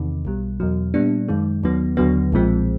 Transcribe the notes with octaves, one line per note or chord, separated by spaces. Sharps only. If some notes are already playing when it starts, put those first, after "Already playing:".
Already playing: E2 C3 D#3
B1 B2 G3
E2 B2 F#3
A#2 G3 B3 D4
F#2 D#3 G#3
D#2 D#3 F#3 B3
D#2 D3 F#3 B3
B1 A#2 F3 G#3 C4